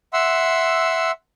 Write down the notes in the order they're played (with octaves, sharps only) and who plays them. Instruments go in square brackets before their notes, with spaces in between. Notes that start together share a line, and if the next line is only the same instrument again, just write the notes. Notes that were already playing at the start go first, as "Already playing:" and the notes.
[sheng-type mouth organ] E5 F#5 C6 E6